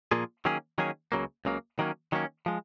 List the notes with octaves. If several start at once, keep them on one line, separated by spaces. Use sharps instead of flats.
A#2 F3 A#3 F4 G#4
D#3 F#3 A#3 C#4 G#4
D#3 F#3 A#3 C#4 G#4
C#2 C#3 F#3 A#3
C#2 C#3 F#3 A#3
D#3 F#3 A#3 C#4
D#3 F#3 A#3 C#4
F3 G#3